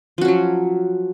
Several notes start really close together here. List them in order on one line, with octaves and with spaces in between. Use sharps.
F3 F#4 C#4 F#3